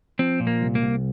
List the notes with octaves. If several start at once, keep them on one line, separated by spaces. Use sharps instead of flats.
F3 C4
A#2
A#3
C2
A#3
C2